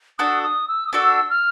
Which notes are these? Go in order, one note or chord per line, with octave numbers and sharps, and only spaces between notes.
D4 F#4 A4 D#6
D#6
E6
D#6
D4 F#4 A4 E6
F6